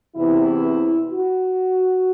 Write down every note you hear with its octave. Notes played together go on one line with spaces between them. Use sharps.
E2 C3 E3 E4
F#4